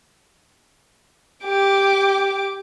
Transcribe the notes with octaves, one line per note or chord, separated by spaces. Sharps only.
G4 D6